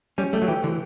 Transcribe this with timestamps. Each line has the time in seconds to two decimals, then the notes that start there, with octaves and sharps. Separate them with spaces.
0.18 G3 C#4
0.33 G3 A3
0.42 F#3
0.48 E3 G4
0.64 D3 E3